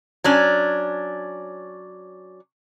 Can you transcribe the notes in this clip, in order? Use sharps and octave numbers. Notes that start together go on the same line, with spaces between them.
F#3 C#4 D4